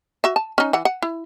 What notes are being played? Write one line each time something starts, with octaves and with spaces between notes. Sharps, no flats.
F#4 E5
A5
C#4 D#4
E3 F#5
F#5
E4